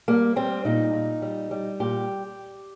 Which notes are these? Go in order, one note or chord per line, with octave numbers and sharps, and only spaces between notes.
G3 A#3
G3 C4
A#2 D#4
A#2
G3
G3
A#2 G4